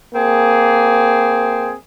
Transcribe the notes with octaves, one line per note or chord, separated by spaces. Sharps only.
A#3 C4 G#4